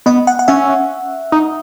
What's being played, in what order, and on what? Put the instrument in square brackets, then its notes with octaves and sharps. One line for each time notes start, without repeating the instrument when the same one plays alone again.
[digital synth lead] B3 [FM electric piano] D#5
[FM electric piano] F#5
F#5
[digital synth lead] C#4 [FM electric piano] E5
[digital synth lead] D#4